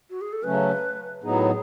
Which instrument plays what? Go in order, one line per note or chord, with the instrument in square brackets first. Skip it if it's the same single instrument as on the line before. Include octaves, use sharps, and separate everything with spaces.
[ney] F#4
G#4
A4
[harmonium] C#3 F#3 A3 C#4 [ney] B4
[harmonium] A2 F#3 B3 D#4 [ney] G#4